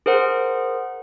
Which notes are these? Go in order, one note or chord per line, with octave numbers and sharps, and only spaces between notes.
G#4 A#4 C5 F#5